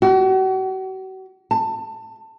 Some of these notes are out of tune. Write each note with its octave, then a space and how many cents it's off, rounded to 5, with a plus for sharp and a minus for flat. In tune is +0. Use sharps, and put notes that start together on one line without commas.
F#4 +40
A5 +20